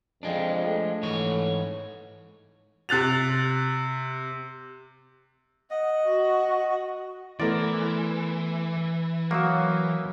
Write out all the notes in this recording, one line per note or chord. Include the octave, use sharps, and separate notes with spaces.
F2 F3 G#3 D4
A3
G#2 E3 C#5
C3 F#6 A6 F7
D#5 F#5
F#4
E3 A3 B3 E4 A#4 C5 D5
F#3 A#3 F#4 C#5 F#5 D#6 E6